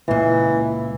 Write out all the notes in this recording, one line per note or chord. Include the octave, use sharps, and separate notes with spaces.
C#2 A#2 E3